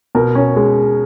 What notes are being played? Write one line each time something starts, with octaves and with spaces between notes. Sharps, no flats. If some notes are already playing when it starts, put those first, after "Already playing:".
B2 A#4
C#4
G#3